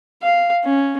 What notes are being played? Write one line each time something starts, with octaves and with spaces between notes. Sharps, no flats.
F5
C#4